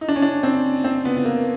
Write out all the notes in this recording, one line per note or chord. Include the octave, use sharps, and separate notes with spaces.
D#4
D4
C#4
D4
C4
C4
B3
B3
A#3